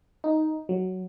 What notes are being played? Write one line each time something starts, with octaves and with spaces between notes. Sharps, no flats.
D#4
F#3